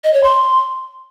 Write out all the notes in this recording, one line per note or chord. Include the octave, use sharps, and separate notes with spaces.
D#5
C#5
C6